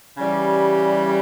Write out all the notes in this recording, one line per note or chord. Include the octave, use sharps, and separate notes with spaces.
C#3 E3 G3